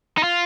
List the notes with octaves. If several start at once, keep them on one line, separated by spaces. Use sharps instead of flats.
D#4
F4